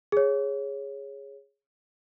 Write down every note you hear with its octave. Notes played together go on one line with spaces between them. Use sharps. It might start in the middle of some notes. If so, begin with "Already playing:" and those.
G#4 C#5